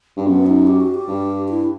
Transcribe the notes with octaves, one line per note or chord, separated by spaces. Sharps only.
G2
F#2 B3
D#4
G4
F#4
G4
G2
E4